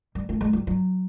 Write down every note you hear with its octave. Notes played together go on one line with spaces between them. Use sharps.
G3
A3
G#3
G3
F#3